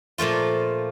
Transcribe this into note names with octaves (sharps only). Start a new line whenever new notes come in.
A#2 F3 A3 F4